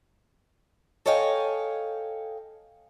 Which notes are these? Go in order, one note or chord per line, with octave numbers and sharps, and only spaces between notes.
A4 C#5 D#5 F5 G5 G#5